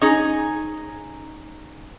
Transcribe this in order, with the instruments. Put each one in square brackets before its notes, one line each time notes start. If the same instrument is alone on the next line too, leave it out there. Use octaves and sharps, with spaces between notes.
[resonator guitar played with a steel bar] C#4 D#4 G#4